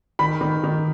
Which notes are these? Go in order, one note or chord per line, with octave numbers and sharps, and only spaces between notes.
D#3 B5
D#3
D#3